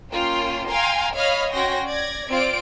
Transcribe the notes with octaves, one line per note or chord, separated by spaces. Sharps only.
A#3 C#4 F4 G5 C6
F5 G5 G#5 A#5 C6
C#5 D#5 F5 B5 F6
C#4 F#4 G5 C6 A#6
D5 G#6 A#6
C4 F4 D5 D7